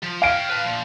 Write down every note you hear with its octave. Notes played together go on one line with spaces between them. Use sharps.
F3
C#5 F5 G5 D7
B4 A5
A#2 F3